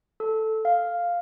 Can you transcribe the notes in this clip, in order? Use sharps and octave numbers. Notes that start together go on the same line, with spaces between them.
A4
F5